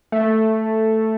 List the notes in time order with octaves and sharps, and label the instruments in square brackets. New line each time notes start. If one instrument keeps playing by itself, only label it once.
[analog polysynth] A3